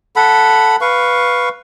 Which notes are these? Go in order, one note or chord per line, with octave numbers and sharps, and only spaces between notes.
A4 F#5 B5
B4 F5 C#6